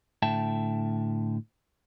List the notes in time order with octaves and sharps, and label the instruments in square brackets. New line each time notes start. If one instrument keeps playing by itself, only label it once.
[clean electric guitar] A2 D3 E5 G5 A5